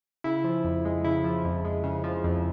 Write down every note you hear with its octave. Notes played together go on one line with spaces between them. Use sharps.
C#3 E4
F3
F2
G#3
C#3 E4
F3
F2
G#3
C#3
F3
F2